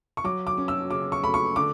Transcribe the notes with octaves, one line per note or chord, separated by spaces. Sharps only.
C#6
F#3 D6
D6
C#4
E6
C#3 D6
C#6
A3 B5
C#6
D3 D6